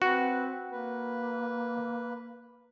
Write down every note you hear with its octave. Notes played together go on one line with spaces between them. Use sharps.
C4 F#4 B4
A#3 B4